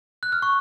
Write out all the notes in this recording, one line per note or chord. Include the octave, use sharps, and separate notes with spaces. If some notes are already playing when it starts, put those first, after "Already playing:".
F#6
F6
C#6